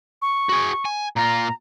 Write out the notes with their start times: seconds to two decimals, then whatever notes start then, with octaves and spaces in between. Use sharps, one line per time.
0.22 C#6
0.49 F#4 G#4
0.85 G#5
1.16 A#2 F4 A#5